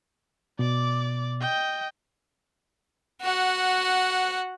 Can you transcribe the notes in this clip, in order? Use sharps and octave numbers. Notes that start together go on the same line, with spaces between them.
B2 D5 D6
D#5 G5
F#4 F#5